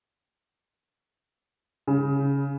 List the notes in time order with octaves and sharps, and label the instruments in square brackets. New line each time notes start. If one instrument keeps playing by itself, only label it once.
[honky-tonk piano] C#3